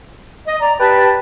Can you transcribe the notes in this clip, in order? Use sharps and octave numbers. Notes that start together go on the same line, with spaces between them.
D#5
D5 A#5
G4 B4 G5 A5